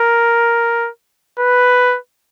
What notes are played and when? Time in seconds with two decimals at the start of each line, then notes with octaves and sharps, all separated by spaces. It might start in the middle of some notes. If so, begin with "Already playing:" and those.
Already playing: A#4
1.39 B4